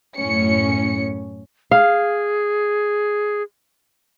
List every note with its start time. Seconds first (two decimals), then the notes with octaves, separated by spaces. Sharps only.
0.17 F#2 A2 C#4 C#7
1.71 G#4 F5